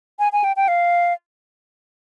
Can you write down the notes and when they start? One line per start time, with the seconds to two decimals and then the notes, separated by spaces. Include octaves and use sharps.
0.19 G#5
0.33 G#5
0.44 G5
0.56 G5
0.68 F5